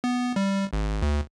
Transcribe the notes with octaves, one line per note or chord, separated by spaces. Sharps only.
B3
G3
G#1
D2